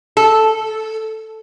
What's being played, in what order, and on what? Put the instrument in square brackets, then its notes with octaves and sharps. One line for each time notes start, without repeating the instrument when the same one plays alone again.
[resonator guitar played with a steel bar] A4